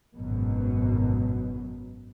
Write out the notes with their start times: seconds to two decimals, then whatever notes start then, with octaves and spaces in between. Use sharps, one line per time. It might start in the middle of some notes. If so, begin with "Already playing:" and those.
0.16 G#1 F#2 B2 F#3